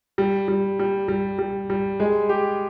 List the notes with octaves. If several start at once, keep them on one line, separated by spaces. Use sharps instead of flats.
G3
G3
G3
G3
G3
G3
G#3
G4